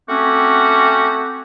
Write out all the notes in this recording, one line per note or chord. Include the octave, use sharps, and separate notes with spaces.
A3 C4 C#4 F#4 G4